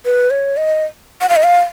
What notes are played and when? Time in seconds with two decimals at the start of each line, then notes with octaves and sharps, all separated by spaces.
0.05 B4
0.30 C#5
0.57 D#5
1.21 F#5
1.29 F5
1.36 D#5
1.43 F5